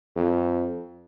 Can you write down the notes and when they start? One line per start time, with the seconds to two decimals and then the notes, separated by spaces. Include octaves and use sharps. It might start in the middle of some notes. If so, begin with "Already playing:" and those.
0.16 F2